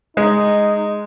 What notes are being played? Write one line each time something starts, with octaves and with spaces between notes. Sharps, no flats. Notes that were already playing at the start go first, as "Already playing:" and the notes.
G#3 D#4